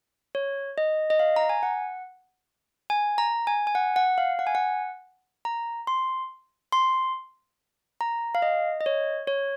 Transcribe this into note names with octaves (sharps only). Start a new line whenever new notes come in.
C#5
D#5
D#5
F5
A#5
G#5
F#5
G#5
A#5
G#5
G#5
F#5
F#5
F5
F#5
G#5
F#5
A#5
C6
C6
A#5
F5
D#5
D#5
C#5
C#5